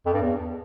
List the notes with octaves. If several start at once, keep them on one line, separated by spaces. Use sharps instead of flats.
F2
G2
E2